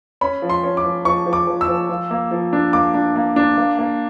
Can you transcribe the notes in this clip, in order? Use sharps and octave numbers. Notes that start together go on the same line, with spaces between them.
C#4 B5
F3
C6
C#4
D6
F3
F3 C#6
F3
D6
F3
E6
F3
F3
A#3
F3
D4
A#3 D6
D4
A#3
D4
A#3
A#3